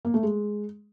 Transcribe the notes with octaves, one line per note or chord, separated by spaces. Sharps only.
A#3
A3
G#3